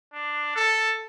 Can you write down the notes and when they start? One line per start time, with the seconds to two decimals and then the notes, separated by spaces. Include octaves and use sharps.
0.13 D4
0.56 A4